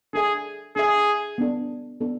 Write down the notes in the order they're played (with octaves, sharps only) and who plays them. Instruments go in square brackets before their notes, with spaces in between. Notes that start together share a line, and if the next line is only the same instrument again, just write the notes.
[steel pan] D4 A4 E5 [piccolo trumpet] G#4
[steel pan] D4 A4 E5 [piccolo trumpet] G#4
[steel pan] B3 D4 A4
B3 D4 A4